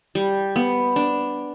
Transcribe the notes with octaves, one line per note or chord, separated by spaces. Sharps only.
G3
B3
D4